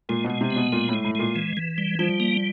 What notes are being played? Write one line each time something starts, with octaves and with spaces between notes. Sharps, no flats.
A#2 G#3
B2
G#3
C3
B3
B2
A#2 G#3
A2 G#3
A2
A#2 G#3
E3
E3
G3
F3 G3
A#3